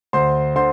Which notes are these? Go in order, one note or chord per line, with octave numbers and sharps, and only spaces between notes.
D2 C5 C6
D3 C5 C6